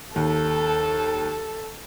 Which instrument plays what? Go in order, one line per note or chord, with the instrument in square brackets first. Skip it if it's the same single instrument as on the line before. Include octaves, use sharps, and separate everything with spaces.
[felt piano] D#2 [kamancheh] A4